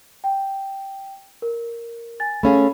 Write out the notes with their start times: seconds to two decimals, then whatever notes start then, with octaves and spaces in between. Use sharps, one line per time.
0.24 G5
1.42 A#4
2.20 G#5 A6
2.43 A3 C#4 G#4 F5 B5